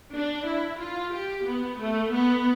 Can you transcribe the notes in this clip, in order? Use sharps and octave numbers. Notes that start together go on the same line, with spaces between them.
D4
E4
F4
G4
B3
A3
B3